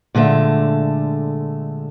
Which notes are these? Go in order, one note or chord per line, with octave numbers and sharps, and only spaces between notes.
A#2 D3 G#3 A3